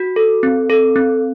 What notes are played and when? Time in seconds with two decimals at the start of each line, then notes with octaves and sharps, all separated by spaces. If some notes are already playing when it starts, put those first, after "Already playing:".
Already playing: F#4
0.16 A4
0.43 C4
0.70 A4
0.96 C4